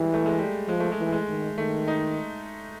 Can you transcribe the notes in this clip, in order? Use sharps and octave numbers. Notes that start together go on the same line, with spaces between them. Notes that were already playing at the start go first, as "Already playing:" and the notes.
Already playing: E3 G3 G#3
A3
G#3
G3
F3 G#3
A3
G#3
E3
G#3
D#3
D#3 A3
D#4